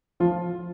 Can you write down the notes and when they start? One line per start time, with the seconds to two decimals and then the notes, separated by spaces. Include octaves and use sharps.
0.20 F3 F4